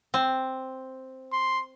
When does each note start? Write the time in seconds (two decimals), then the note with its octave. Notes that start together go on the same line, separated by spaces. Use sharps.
0.14 C4
1.33 C6